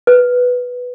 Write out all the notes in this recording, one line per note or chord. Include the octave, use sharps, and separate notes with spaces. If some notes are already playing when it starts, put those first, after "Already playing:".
B4